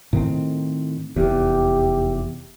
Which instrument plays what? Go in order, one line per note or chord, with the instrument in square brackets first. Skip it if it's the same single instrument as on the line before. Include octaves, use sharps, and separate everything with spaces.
[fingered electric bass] A2 D#3 C4
[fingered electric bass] F1 E2 [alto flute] G4